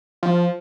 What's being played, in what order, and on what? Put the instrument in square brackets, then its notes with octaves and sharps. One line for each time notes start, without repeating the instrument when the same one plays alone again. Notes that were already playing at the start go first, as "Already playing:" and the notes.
[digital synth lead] F3